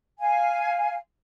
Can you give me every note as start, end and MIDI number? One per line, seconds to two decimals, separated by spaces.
0.19 0.95 77
0.19 0.95 80